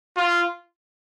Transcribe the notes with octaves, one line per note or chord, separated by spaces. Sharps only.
F4